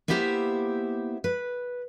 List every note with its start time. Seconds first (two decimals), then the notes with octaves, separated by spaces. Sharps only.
0.08 A#3 B3 E4 G4 C5 E5
1.24 B4